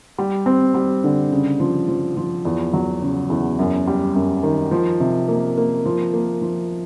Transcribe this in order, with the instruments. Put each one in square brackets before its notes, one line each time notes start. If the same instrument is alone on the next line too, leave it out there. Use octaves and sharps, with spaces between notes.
[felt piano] G3
C4
G3
D3
C#3
F3
F3
F3
E2
F#3
C#3
E2
F#2
G3
F#2
D#3
F3
C3
A#3
A#3
F3
A#3
F3